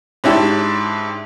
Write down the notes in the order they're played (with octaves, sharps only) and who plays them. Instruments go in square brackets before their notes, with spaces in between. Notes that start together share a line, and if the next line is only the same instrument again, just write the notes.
[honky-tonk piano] G#2 C#4 D4 E4 G4 A5